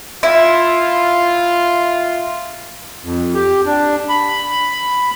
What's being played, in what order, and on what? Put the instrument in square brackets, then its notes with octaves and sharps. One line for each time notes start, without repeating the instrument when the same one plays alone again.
[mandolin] E4 [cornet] F4
[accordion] F2
G4
D4
B5